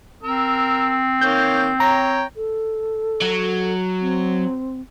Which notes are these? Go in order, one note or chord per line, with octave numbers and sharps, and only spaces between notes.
C4 A#4 E6
D#3 A#3 C#5 G6
C#5 G5 A#5
A4
F#3
C4